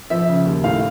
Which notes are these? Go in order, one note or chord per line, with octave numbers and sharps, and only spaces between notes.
F3 E5
C#3
D#2
A2 F5